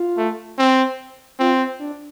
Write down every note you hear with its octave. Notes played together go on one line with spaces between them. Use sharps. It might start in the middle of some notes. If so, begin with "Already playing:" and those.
Already playing: F4
A3
C4
C4 F4
D4